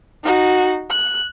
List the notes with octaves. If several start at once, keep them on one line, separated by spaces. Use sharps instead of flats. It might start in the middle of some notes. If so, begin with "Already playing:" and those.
D#4 F#4
F#6